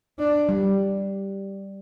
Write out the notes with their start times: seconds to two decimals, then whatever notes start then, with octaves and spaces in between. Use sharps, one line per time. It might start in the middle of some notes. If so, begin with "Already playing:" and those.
0.18 D4
0.49 G3